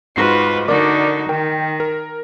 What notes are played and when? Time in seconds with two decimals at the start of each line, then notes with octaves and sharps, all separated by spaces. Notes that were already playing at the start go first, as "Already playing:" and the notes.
0.16 G#2 F4 F#4 B4 C7
0.68 D3 D#4 F#4 A#4 D5 D6
1.29 D#3 A#4 G5
1.80 A#4